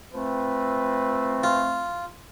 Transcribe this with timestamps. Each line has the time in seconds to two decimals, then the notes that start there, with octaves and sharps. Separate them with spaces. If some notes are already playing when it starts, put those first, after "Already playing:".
0.14 F3 A3 C4 B4
1.44 F4